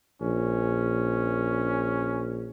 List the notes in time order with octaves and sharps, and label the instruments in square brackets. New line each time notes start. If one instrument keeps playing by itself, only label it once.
[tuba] A#1 [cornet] C#4